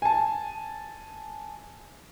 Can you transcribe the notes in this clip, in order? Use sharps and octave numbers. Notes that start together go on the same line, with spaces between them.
G#5 A5